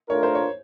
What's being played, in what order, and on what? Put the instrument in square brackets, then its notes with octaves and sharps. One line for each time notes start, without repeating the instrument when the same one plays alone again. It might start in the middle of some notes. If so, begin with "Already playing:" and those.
[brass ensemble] A3 D4 F4 A#4 [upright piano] C#5
[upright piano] C5
C#5